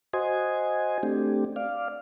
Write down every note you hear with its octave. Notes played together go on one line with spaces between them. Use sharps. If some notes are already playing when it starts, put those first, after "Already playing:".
F#4 C5 D#5 G#5
A3 C4 D4 G4
D5 F5